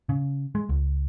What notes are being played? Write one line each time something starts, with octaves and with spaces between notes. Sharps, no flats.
C#3
G#3
C#2